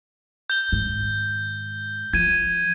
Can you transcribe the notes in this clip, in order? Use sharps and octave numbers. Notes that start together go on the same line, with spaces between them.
G6 G7
G#2 D#3
F3 G#6 D#7